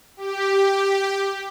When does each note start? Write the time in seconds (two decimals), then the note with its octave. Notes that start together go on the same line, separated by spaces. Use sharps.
0.17 G4